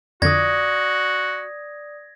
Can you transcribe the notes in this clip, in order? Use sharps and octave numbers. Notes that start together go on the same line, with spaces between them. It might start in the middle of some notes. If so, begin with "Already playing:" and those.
F2 D3 F#4 D5 D#6 G#6 A#6